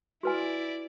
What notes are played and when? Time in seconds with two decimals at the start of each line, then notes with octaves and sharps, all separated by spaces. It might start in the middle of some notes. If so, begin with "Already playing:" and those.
0.23 E4 F#4 B4 D5 G#5